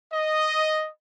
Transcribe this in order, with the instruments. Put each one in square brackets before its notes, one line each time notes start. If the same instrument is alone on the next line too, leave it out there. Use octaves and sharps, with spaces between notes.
[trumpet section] D#5